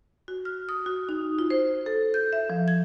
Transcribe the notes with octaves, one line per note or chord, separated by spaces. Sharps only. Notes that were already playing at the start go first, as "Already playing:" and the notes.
F#4
F6
D#6
F#4
D#4
F4
C5
A4
G6
E5
F3
G#6